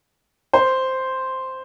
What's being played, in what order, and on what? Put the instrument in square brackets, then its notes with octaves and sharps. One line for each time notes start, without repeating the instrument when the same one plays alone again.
[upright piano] C5